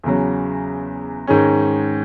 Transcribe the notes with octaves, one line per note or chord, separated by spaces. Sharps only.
E2 C#3 F#3
G#2 D#3 G#3 C#4